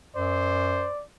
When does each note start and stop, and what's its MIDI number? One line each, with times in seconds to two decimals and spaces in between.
0.16 0.88 42
0.16 0.91 72
0.16 1.03 74